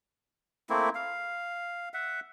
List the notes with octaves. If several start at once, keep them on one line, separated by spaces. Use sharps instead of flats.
A3 A#3 C4 E4
F5
E5 F#5